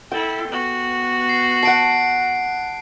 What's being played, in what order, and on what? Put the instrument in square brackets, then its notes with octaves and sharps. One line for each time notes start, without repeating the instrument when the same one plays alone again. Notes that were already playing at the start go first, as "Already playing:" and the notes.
[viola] E4 A4 [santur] G5
[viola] B3 F#4
[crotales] C7
[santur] F#5 A5 [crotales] C7 D7